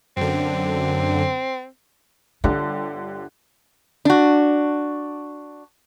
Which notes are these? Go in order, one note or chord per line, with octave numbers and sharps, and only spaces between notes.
F#2 D3 C4
G1 D3 D4 G4
D4 F#4